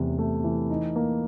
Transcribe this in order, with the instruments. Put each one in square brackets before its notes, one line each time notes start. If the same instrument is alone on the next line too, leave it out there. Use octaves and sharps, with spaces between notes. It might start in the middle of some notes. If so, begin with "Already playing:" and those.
Already playing: [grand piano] E2 C3 E3 A3
A3
E3
D#4
A#3